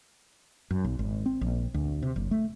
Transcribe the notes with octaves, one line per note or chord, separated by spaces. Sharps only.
F#2
B1
G#1
C4
A#1
D2
C3
F#1
A3